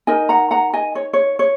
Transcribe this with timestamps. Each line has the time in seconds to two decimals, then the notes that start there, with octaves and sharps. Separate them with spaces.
0.07 D#4 A#4 D#5 G#5
0.29 F#5 A#5
0.51 F#5 A#5
0.73 D#5 G#5
0.95 C#5
1.13 C#5
1.39 C#5